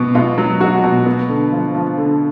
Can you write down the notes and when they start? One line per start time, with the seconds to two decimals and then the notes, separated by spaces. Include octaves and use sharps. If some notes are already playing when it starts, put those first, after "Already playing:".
Already playing: B2 F#3 B3
0.15 B2 F4
0.38 F#3
0.60 F#3 F#4
0.84 B2
1.06 B3
1.29 D3
1.52 F3
1.75 F3
1.98 D3